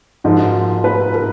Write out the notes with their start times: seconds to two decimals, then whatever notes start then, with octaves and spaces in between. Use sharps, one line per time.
0.24 G#2 F3 A#3 D#4 F#4 A#4
0.84 B4
1.14 A#4